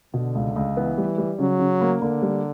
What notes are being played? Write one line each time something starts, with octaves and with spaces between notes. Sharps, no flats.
B2 D3
C#2
C#2
E3 B3
G3
G3
C#3 F#3
C#3
A#3
D3 A#3
G3